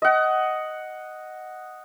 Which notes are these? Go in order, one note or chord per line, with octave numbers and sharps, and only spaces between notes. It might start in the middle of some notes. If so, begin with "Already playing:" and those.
D#5 F#5